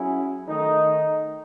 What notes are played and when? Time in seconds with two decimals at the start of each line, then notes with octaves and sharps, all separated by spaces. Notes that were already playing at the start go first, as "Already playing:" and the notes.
Already playing: F#3 C#4 E4 G#4
0.46 D#3 A3 D#4